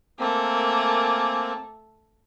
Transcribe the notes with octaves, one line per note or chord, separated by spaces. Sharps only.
A3 A#3 C4 A#4 G#5 D6